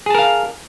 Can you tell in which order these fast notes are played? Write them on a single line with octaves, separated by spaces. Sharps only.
G#4 A5 A#4 F5